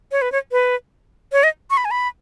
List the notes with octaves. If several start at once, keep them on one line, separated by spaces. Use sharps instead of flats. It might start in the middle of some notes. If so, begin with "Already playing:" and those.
C#5
B4
C#5
B4
C#5
D#5
C#6
B5
G#5
B5